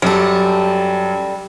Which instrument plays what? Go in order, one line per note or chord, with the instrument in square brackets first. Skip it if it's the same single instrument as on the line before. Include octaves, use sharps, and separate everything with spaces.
[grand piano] F#2 [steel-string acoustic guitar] G3 A4